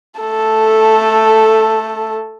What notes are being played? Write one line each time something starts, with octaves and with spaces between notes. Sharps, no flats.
A3 A4